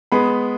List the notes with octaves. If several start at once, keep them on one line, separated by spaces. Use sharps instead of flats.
G#3 B3 B5